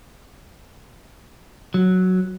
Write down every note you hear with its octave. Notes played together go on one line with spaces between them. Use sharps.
F#3